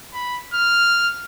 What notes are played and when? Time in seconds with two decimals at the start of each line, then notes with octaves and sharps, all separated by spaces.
0.14 B5
0.54 F6